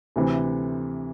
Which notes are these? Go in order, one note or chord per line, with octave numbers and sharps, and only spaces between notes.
D2 C3 E3